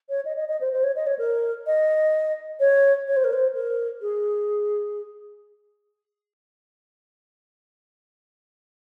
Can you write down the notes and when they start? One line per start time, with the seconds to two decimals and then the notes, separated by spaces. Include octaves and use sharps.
0.09 C#5
0.25 D#5
0.37 D#5
0.49 D#5
0.61 C5
0.73 C5
0.83 C#5
0.96 D#5
1.07 C#5
1.18 A#4
1.67 D#5
2.60 C#5
3.08 C#5
3.16 C5
3.24 A#4
3.33 C5
3.55 A#4
4.01 G#4